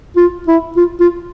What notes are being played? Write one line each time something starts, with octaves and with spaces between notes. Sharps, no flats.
F4
E4
F4
F4